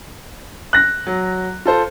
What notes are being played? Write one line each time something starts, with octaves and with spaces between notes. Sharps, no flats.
F#6 A#6
F#3
F4 A4 C5